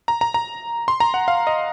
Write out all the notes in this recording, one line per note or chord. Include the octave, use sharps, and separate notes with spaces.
A#5
A#5
A#5
C6
A#5
F#5
F5
D#5